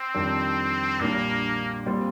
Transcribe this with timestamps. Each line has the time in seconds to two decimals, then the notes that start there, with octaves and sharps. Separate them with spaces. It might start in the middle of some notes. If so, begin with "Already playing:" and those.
Already playing: C4
0.14 F2 D#3 G3 D4
1.00 A#1 A#2 G3 A#3 D4
1.86 A#2 G3 C4